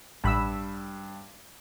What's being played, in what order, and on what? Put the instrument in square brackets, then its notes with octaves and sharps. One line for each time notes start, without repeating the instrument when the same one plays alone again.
[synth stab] A1 B5 E6 [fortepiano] G2